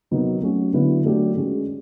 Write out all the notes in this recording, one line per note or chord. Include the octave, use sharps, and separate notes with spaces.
C3 D#3 F#3 B3 D#4
F#3 A3 C#4 F#4
D3 F#3 B3 E4
F#3 A3 D4 G4
D#3 G#3 C#4 F#4